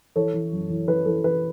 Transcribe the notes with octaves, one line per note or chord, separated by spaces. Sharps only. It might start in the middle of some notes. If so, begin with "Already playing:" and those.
E3 A4 C#5
E3
F#2
E3
E3 B4
E3 A4
E3 B4